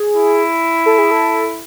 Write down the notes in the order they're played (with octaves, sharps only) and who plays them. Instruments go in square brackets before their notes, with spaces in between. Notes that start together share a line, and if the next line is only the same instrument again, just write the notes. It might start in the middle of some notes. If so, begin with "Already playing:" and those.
Already playing: [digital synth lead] G#4
[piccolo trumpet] E4
[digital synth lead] A4
G#4
A4